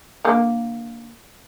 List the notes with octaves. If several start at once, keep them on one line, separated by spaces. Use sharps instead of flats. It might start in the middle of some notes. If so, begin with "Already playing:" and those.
D3 A#3